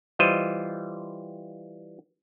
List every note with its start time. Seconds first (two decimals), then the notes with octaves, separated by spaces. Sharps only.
0.19 E3 G3 F4 C5 D#5